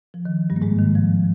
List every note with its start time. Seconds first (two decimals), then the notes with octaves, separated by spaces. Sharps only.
0.14 F3
0.25 D#3
0.50 G2 G3
0.56 A#3
0.62 G#2 G#3
0.79 D#3
0.95 F3